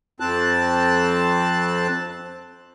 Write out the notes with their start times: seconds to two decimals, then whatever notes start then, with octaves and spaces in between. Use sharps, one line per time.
0.20 F2 C4 A5 F#6